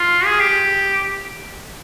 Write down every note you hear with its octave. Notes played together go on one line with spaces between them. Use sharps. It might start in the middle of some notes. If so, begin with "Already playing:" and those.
Already playing: F4
G#4
G4